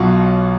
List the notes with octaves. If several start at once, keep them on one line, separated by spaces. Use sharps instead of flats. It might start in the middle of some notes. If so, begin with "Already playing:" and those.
Already playing: B1 B2 F#3 F4 F#4